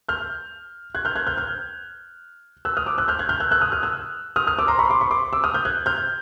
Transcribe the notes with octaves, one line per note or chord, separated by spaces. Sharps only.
F6 G6
F#6 G#6
F6 G6
F#6 G#6
F6 G6
F6 G6
E6 F#6
D#6 F6
D6 E6
E6 F#6
F6 G6
F#6 G#6
F6 G6
E6 F#6
E6 F#6
D#6 F6
D#6 F6
E6 F#6
D#6 F6
D#6 F6
D6 E6
A#5 C6
B5 C#6
C6 D6
B5 C#6
C6 D6
D6 E6
D#6 F6
F6 G6
F#6 G#6
F6 G6